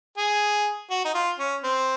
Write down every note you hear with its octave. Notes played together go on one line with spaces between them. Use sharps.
G#4
F#4
D#4
F4
C#4
C4